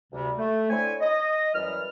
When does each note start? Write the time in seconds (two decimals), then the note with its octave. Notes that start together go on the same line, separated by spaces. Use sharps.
0.12 D2 C3 G3
0.38 A3
0.70 D3 C4 E4 C#5 G#5
1.01 D#5
1.54 F#2 E3 G3 F6